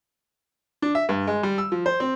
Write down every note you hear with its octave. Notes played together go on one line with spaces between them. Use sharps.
D4
E5
G2
G#3
G3
E6
F3
C5
C4